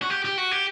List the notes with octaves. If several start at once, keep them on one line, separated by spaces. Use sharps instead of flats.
F#4
G4
G4
F#4
G4